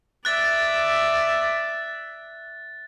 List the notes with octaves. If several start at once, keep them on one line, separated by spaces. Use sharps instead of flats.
D5 E5 F#6 A6